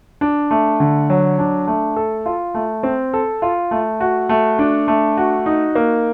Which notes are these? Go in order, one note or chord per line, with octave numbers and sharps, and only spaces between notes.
D4
A3
D3
F#3
D4
A3
A4
F4
A3
C4
A4
F4
A3
F#4
A3
D4
A3
F#4
D#4
A#3